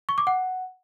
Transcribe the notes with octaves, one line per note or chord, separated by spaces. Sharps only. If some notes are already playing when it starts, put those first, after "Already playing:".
C#6
D6
F#5